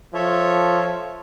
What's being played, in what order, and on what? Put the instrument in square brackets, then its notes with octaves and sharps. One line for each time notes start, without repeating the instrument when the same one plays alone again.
[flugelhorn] F3 [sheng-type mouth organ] A4 C#5 E5